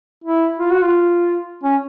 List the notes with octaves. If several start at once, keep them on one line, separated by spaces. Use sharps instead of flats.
E4
F4
F#4
F4
C#4